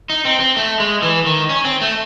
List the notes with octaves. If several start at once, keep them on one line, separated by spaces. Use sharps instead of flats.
D#4
C4
C4
A3
G#3
E3
D#3
C#4
C4
A3